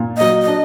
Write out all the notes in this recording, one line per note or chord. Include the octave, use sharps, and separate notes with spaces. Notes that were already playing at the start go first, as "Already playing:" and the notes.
Already playing: A#2
F#3 D#5
D4 D#5